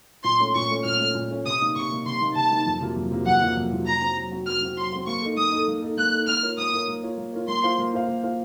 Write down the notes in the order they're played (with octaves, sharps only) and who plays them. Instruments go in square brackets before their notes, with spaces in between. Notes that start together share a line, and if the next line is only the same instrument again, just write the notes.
[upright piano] A#2 [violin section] C6
[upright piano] A3 C#4
[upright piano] A#2 [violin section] C#6
[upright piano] A3 C#4
[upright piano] A#2 [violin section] F6
[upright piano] A3 C#4
A#2
A3 C#4
[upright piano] C3 [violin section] D#6
[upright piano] D#3 A#3 D#4
[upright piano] C3 [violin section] C#6
[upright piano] D#3 A#3 D#4
[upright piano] C3 [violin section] C6
[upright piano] D#3 A#3 D#4
[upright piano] C3 [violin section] A5
[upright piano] D#3 A#3 D#4
F2
C3 F#3 A#3 F4
F2
C3 F#3 A#3 F4
[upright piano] F2 [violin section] F#5
[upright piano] C3 F#3 A#3 F4
F2
C3 F#3 A#3 F4
[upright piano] F#3 [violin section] A#5
[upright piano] C4 F#4
F#3
C4 F#4
[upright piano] F#3 [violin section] F6
[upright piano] C4 F#4
[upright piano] F#3 [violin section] C6
[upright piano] C4 F#4
[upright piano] A#3 [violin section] C#6
[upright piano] D#4 A4
[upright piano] A#3 [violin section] D#6
[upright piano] D#4 A4
A#3
D#4 A4
[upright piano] A#3 [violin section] F#6
[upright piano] D#4 A4
[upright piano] A#3 [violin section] F6
[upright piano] F4 A#4 C#5
[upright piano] A#3 [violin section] D#6
[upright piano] F4 A#4 C#5
A#3
F4 A#4 C#5
A#3
F4 A#4 C#5
[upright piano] A#3 [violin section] C6
[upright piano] F4 C5 F5
A#3
F4 C5 F5
A#3
F4 C5 F5